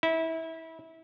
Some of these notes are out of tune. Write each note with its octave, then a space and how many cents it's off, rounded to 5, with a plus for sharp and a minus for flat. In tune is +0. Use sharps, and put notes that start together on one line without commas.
E4 -25